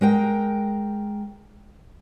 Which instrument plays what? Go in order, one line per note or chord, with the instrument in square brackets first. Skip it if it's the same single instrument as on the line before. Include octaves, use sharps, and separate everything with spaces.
[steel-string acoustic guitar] G#3 A#4 G5